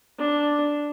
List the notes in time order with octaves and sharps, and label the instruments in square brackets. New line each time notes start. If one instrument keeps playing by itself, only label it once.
[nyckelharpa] D4